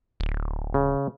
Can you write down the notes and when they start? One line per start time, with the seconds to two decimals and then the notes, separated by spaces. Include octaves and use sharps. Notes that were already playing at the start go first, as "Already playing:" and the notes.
0.20 D1
0.74 C#3